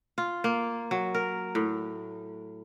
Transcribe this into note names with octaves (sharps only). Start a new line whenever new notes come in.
F4
A#3
F#3
A#4
A2